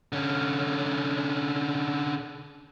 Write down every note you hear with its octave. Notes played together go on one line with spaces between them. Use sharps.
D3 C#4